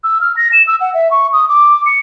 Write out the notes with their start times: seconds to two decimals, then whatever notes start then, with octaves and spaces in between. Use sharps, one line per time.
0.04 E6
0.21 F6
0.37 A#6
0.53 E7
0.67 E6
0.81 F#5
0.94 E5
1.11 C#6
1.33 D#6
1.49 D6
1.86 C#7